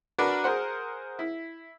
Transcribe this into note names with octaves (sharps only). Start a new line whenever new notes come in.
D4 F#4 A#4 B4 D5
G#4 A#4 C5 F#5
E4